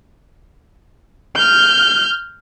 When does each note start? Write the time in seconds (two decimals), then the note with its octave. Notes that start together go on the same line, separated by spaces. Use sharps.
1.36 F6 G6